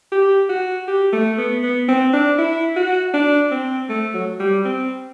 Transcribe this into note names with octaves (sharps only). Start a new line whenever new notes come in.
G4
F#4
G4
A3
B3
B3
C4
D4
E4
F#4
D4
C4
A3
F#3
G3
C4